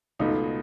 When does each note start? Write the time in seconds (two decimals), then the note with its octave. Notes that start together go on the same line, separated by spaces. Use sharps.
0.19 C#2 B2 A3 D#4